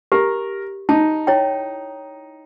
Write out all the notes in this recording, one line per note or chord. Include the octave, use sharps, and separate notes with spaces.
G4 A#4
D#4 A5
E4 C#5 G5